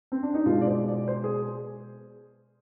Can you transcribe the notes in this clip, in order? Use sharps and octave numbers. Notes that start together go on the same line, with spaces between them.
C4
D4
D#4
B2 G#3 F4
D5
C5
D5
C5
G#4